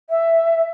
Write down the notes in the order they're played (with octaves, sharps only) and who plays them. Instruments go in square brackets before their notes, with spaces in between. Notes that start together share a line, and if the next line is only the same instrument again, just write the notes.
[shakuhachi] E5